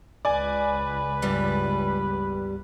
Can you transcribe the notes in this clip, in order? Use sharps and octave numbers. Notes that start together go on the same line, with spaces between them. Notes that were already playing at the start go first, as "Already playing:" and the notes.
C#2 B4 D5 G#5
E2 G2 G3